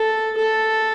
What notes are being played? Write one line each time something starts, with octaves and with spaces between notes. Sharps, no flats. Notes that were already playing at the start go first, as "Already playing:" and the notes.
Already playing: A4
A4